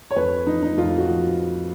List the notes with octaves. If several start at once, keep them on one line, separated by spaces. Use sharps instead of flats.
C#5
F2 B4
F3 D#4
D#4
F2 F4
F#4
F3